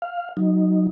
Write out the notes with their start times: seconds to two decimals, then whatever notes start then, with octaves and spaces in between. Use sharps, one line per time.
0.02 F5
0.37 F#3 D#4